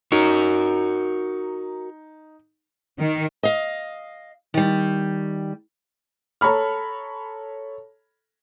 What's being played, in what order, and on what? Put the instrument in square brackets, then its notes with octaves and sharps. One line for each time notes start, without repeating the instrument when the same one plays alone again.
[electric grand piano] D#4 [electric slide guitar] F#4 A#4
[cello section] D#3
[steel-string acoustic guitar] D#5 F5
D#3 G3
[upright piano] A4 C#5 A#5 B5 F6